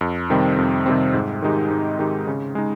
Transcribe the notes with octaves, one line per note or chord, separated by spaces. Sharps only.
F2
C3 D#3 G3 C4
F2
C3 D#3 G3 C4
G#2
D#3 G#3 D#4 G4
G#2
D#3 G#3 D#4 G4
C#3
G#3 D#4